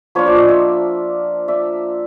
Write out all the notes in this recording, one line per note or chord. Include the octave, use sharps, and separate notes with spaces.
F3 A#3 D4 F4 B4 C#5
C5 D5
C#5 D#5
D5 E5
D5 E5